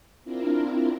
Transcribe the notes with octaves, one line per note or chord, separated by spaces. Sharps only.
C4 D4 E4 F4 A#4